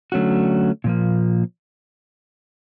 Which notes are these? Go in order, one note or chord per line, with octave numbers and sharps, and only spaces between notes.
D3 F#3 A3 C#4 F#4
A#2 F3 A#3